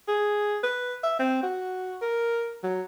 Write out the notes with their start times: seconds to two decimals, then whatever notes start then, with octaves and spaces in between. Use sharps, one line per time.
0.08 G#4
0.63 B4
1.03 E5
1.20 C4
1.43 F#4
2.02 A#4
2.63 F#3